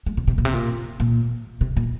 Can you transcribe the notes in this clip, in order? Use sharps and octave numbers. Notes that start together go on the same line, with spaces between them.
G#3
C3
C3
A#2
C3
A#2
A#2
C3
A#2